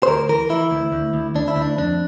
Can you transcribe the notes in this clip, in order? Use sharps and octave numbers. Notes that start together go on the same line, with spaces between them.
C5
D2 A#4
E3 A#4
E3 E4
D2
D2
D2
D2 D4
E4
D2
D4
F2 D4